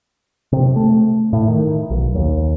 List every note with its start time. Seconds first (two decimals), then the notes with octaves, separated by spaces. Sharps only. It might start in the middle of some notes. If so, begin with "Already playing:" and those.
0.52 C3
0.76 A3
1.33 A2
1.48 D#3
1.90 B1
2.15 D#2